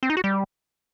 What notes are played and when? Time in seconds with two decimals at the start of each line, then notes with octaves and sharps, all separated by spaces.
0.03 C4
0.10 D#4
0.17 F#4
0.24 G3